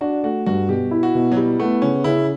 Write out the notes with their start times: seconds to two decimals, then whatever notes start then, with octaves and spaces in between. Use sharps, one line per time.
0.01 D4 F#4
0.24 A3 F#4
0.46 G2 F#4
0.69 B2 G4
0.91 E4
1.03 F#4
1.15 B2
1.32 F#3
1.36 G3 E4
1.60 A3 B3
1.82 C#3 C#4
2.04 C#3 E4